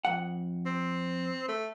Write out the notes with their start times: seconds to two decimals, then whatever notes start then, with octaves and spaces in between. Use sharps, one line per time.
0.05 F2 F#5
0.66 C4
1.48 A3